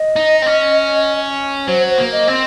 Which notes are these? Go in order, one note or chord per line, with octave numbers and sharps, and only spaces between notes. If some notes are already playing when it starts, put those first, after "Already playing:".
Already playing: D#5
D#4
C4
C#4
F#3 C5
C5
A#3
D#5
C4